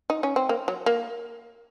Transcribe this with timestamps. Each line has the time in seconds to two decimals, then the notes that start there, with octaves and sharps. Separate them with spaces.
0.10 D#4
0.23 C#4
0.36 C4
0.49 A#3
0.68 F#3
0.86 A#3